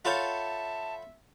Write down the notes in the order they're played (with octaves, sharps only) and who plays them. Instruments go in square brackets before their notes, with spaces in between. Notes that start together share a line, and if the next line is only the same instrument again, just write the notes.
[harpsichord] F4 A4 C#5 [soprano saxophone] E5 [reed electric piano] F#5 B5 G6 [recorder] A5